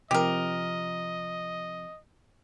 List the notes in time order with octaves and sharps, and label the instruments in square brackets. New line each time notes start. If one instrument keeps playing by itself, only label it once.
[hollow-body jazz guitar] C3 F3 C4 [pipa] G4 A#4 [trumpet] D#5